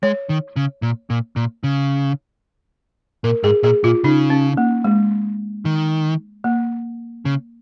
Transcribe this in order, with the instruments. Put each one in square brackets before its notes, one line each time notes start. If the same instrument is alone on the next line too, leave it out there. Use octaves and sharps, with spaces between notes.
[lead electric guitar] G#3 [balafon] C#5
[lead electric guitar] D#3
C#3
A#2
A#2
A#2
C#3
[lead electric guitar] A#2 [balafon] A#4
[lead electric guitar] G#2 [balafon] G#4
[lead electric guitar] A#2 [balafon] G#4
[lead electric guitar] A#2 [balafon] F4
[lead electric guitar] C#3 [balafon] D#4
[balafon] C#4
A#3
G#3
[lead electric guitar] D#3
[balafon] A#3
[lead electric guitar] C#3